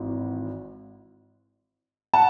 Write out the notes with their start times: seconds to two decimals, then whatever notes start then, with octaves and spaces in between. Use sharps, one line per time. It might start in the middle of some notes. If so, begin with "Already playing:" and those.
Already playing: G#1 G#2 E3
2.14 F#5 A5